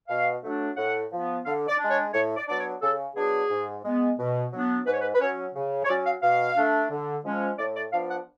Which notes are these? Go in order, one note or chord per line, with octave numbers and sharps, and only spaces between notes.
B2 F5
F#3 A3 D4
A2 F#5
F3 B3
D3 F5
D5
G#3 D4
C#5
A2 C#5
D5
F#3 B3 D4 D5
C#5
C#3 A4
F#3 B3 D4 G#4
G#2
G#3 B3
B2
F#3 B3 D4
G#2 B4
C#5
B4
B4
F#3 C#4 C#5
C#3
C#5
F#3 C#4 D5
F5
B2 F5
A3 D4
D3
F3 G#3 C#4
A2 D5
D5
F3 B3 D4 F5
F#5